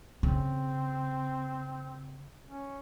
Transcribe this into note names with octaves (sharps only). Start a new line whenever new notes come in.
C#3 C4
C#4